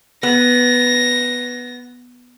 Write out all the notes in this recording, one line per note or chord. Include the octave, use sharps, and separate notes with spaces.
B3 A#6